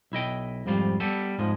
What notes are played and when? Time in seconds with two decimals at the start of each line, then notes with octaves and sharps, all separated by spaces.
0.12 B1 E4 D#5 G5
0.66 F2 G#2 G3 F4
1.00 G3 B3 A4
1.38 F2 G#2 F3 G#3